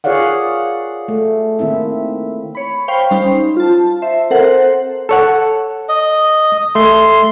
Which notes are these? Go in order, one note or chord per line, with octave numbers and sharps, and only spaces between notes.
F4 G#4 C#5 D5 F5 F#5
A3
D#3 A#3 C4 E4 E5
C#5 B5
C5 F5 G5 B5 C#6
G3 C#4 D#4 C5
F4 A5
C5 E5
C4 A4 A#4 C5 F#5
A4 C#5 F#5
D#5
A3 C6